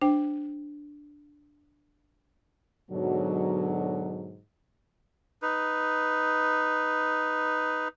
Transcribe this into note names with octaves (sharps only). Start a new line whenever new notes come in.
D4 C5 G5
G#2 B2 D3 F#3
D#4 B4